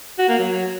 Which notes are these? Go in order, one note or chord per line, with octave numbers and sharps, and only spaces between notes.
F#4
A#3
F#3